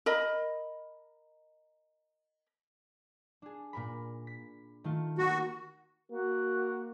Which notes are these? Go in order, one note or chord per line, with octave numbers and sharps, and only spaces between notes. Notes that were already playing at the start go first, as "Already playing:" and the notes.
A#4 D#5 B5
D4 G#4
A#2 A#4 B5
B6
D#3 A3 F4
A#3 F#4 D#5
A#3 F#4